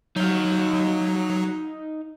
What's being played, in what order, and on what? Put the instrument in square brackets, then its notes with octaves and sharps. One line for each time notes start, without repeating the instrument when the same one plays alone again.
[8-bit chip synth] F#3 [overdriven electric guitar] D#4 F5